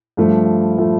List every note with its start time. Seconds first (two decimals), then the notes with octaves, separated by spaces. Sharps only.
0.17 G2 F3 A3
0.78 F3 A3